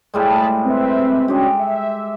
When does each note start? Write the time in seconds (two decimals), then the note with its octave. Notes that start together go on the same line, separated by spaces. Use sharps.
0.14 A2 G3 G#3 G#4 A5 B5
0.65 C4 B4 E5
1.28 G#3 C#4 D4 F#4 G4
1.59 E5